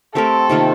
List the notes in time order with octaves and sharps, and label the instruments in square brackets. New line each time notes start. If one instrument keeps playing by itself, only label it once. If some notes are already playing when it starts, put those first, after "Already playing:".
[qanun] A3 C4 G4 A#4 [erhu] A4
[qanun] C3 D#3 A#3 F4